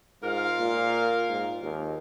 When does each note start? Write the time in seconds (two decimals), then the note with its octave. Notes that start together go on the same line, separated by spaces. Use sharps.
0.23 G#2 F4 A#4 F5
0.59 A#2
1.29 G#2
1.61 D#2